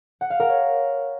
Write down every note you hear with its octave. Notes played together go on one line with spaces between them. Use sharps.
F#5
F5
A#4
C#5